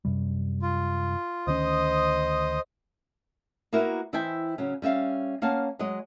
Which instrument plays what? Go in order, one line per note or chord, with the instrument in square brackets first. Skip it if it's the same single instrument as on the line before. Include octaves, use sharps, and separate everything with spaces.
[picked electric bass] F#2 C3 G3
[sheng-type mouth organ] F4
[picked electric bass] D2 D#3 C#4 [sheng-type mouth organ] C5 D#5 D#6
[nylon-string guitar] A#3 B3 E4 F#4 A#4
E3 E4 C5 D#5 G5 G#5
C#3 F#3 C#4
G3 C#4 E5 F5
A#3 C#4 F5 F#5 A5
F#3 G#3 C#5 D#5